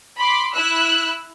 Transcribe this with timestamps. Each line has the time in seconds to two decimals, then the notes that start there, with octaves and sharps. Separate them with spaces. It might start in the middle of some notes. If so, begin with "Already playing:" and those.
0.18 B5 C6 D6
0.54 E4 E6 F#6